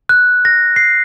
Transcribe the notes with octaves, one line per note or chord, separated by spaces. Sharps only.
F#6
A#6
C7